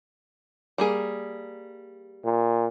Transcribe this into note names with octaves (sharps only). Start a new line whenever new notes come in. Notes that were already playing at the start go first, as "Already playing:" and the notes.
G3 A#3 G#4
A#2